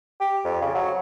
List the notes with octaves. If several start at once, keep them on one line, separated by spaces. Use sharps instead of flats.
G4
F2
C#3
F#3